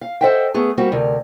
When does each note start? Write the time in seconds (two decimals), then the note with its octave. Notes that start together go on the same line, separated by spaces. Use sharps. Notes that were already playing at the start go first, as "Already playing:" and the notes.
0.01 F5
0.21 A4 C5 D#5 E5 F#5 G5
0.54 A3 B3 G#4
0.78 G3 A#3 C4 F#4
0.92 D2 C3 A#4